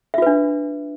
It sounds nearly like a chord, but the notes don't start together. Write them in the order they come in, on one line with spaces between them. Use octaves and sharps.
E5 F4 B4 D4